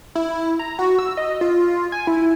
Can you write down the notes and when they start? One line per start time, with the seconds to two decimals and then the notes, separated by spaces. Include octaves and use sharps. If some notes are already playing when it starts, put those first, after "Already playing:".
0.15 E4
0.59 A#5
0.79 F#4
0.99 E6
1.17 D#5
1.41 F4
1.92 G#5
2.07 E4